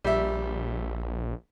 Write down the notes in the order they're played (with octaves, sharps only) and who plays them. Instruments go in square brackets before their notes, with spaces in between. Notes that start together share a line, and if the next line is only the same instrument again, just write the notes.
[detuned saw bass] A#1 [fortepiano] G3 E5